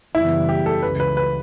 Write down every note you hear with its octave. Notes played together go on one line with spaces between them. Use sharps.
F#2 C#3 E3 G3 B3 E4
G4
A4
C#2 C#3 E3 B4
B4
B4